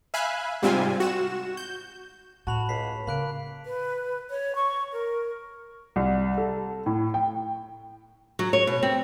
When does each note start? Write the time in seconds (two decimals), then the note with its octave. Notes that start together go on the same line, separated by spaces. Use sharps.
0.14 E5 F5 G#5 B5 F#6
0.62 G#2 C3 G3 C4 F4 G#5
1.00 F#4 E7
1.57 G6
2.47 A2 F#4 A5 B5 F7
2.69 C#2 B5 B6 C7
3.07 C#3 A#3 B5 F#6 D7
3.66 B4
4.30 C#5
4.55 C#6
4.93 A#4
5.96 C2
6.38 A4
6.86 A2
7.14 G5
8.39 F#3
8.53 C#5
8.67 B2
8.83 C4